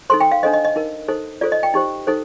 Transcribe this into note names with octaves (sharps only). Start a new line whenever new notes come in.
D#4 A4 C5 C6
G5
F5
D4 A4 C5 D#5
D#5
D#5
D#4 A#4
D#4 A4 C5
F4 A4 C5 D5
D#5
G5
D#4 G4 C5
D#4 A4 C5